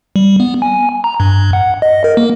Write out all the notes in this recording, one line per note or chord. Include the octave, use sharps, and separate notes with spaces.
G3
B3
G#5
A#5
G2
F#5
D#5
A#4
A#3